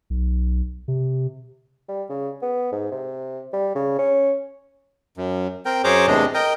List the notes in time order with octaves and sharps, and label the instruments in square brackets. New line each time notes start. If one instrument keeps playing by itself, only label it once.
[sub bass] B1
C3
[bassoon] G3
C#3
B3
G#2
C3
G3
C#3
C#4
[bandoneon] F#2
C4 A#4 G5
F#2 G#4 C5 C#5 A#5 D6
E2 A2 C3 G#3 D4 D#5
A#4 D#5 G5